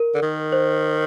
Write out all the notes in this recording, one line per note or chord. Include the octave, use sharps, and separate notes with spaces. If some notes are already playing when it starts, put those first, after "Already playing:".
Already playing: A#4
D3
D#3
C5